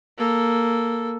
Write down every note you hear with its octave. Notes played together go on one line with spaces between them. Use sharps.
A#3 A4